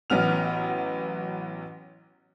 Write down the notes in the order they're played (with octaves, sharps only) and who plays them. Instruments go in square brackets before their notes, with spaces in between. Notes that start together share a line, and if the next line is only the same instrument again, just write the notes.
[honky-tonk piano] A1 F#3 B3 F6 F7